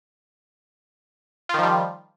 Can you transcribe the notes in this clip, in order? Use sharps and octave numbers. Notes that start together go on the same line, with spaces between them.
D#3 F3 G3 F4